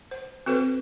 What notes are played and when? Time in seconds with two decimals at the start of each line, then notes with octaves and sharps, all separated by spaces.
0.11 C5
0.46 C4 F#4 A4 B4 C5